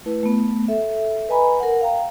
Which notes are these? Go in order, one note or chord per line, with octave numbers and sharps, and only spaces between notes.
A3 E4 B4
A3 B3
A4 E5
B4 D#5 G#5 A#5 B5
A#4 F#5
F5 G5 A#5